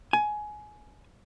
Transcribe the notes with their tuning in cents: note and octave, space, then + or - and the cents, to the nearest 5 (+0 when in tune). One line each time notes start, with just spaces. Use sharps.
G#5 +20